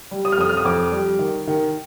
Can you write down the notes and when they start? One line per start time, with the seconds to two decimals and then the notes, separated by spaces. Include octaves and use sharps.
0.11 G3
0.25 D#6
0.32 F6
0.37 F2 D#6
0.49 F6
0.57 D#6
0.65 F2 D6
0.92 G3
1.19 D#3
1.47 D#3